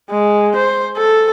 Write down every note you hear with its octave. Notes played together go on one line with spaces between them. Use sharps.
G#3
C5
A4